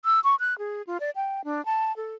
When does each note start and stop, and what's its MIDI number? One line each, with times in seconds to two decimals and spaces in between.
0.05 0.20 88
0.24 0.35 85
0.40 0.57 90
0.58 0.82 68
0.87 0.98 65
1.00 1.10 74
1.16 1.44 79
1.44 1.64 62
1.66 1.94 81
1.96 2.15 69